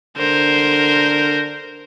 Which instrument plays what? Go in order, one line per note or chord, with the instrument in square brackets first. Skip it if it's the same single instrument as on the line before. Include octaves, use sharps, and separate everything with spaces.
[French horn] D3 [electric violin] A#4 C5